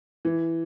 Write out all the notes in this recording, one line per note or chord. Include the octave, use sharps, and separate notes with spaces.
E3